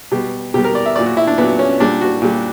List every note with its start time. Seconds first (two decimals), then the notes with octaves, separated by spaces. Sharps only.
0.11 B2 G3 G4
0.54 B2 G4
0.58 G3
0.64 A#4
0.75 D5
0.86 E5
0.96 A#2 F#3 D5
1.06 F#4
1.17 E4
1.27 D4
1.38 A#2 F#3 B3
1.59 C#4
1.80 A#2 G3 D4
2.01 F#4
2.22 A#2 G3